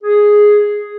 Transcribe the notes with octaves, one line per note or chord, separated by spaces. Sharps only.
G#4